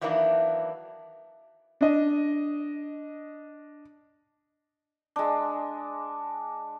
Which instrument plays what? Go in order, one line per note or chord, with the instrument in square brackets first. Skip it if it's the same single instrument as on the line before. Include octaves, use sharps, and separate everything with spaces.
[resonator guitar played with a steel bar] D#3 E3 F#3 A#3 D4 E4
[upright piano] D4 D#5
[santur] G#3 D4